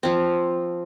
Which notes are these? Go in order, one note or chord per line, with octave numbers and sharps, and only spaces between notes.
F3 C4